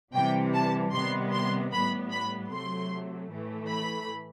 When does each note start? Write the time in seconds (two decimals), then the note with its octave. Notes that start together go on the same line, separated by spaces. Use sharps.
0.15 C3 E3 G3 G5
0.54 A5
0.93 C3 D#3 G3 B3 C6
1.33 C6
1.72 A2 G3 B3 B5
2.12 B5
2.51 C3 F#3 A3 C6
3.30 A2 E3 A3
3.69 B5